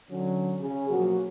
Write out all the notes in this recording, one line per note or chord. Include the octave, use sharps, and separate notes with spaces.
D3 F#3 C#4
C#3 G#4
B2 F3 F#3 A#3 F#4